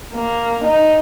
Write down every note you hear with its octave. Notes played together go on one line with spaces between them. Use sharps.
A#3
D#4